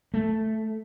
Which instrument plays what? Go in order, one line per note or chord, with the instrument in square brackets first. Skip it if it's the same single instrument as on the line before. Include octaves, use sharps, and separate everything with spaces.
[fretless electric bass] A3